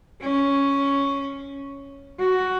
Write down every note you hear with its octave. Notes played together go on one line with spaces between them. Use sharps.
C#4
F#4